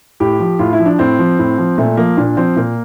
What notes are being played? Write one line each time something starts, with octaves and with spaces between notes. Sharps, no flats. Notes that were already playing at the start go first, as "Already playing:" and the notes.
A2 G4
F3
A2 F4
E4
F3
D4
A2 C4
F3
A2
F3
A#2 A3
F3 A#3
A#2 D4
F3 C4
A#2 A#3